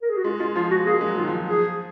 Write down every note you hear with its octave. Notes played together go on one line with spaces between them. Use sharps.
A#4
G#4
F#4
G#3 F4
G#3 F4
F3 F4
G#3 F#4
A#3 G#4
G#3
F#3
D#3 F4
F3
F3 G#4